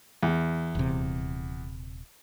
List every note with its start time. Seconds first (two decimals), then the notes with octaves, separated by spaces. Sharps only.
0.23 E2
0.75 D#1 C3